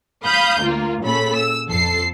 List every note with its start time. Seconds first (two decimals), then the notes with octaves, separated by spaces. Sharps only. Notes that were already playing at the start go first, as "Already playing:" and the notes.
0.25 F5 B5 D#6 G6
0.61 D2 A#3 F4
1.03 A#2 C#3 A4 B5 B6
1.35 E6
1.68 F2 A4 C7